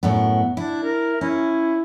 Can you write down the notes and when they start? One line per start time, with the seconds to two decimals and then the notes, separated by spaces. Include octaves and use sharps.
0.03 F#2 A2 B3
0.57 D4 E4
0.84 A#4
1.21 C#4 E4